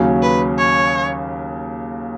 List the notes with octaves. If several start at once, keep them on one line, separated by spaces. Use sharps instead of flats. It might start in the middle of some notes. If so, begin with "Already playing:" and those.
Already playing: D#2 C#3 F#3 C#4
B4
C#5